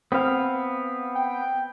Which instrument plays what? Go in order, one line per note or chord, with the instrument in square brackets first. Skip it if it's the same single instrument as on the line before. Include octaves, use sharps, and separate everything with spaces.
[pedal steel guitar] B3 F5 [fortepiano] C4
[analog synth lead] G5